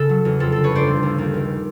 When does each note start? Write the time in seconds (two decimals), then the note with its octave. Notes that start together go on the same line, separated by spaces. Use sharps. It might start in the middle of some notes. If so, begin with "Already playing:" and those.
Already playing: C#3 A4
0.09 F#3
0.25 E2
0.40 F2 A4
0.52 D3 A4
0.64 B4 C#5
0.72 G1 C5 D5
0.87 D#2
1.03 D#2
1.18 D#2
1.34 C#2